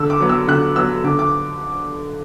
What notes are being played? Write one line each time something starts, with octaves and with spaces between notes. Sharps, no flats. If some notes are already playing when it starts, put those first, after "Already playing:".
Already playing: D3 E6
D6
F#3 B3
E6
D3 F#6
F#3 B3 E6
D3 D6
D6